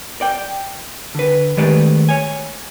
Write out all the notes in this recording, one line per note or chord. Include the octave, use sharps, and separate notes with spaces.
D5 G5
D3 B4
D#3 G#3 A3 G4 B4 D5
C#5 G#5